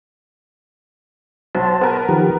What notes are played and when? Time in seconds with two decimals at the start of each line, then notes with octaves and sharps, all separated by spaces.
1.55 B1 F#3 C5 A5
1.81 B3 A#4 B4
2.09 D#3 F3 G4